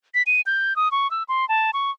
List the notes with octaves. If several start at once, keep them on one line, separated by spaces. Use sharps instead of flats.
B6
D#7
G6
D#6
C#6
E6
C6
A5
C#6